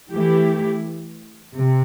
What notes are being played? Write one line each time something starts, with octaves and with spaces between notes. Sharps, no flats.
E3 A3 E4 G4
C3